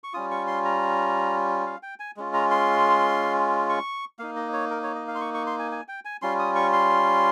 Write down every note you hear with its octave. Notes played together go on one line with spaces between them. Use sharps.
C#6
G3 C#4 F4 D#6
C#6
C6
A#5
F5
G5
G#5
G#3 C#4 F4
A#5
C6
C#6
A#3 D#4 F5
D#5
C#5
A#4
C#5
D#5
F5
C6
C#6
C#6
C6
G#5
G#5
G5
G#5
G3 C#4 F4 C6
D#6
C#6
C6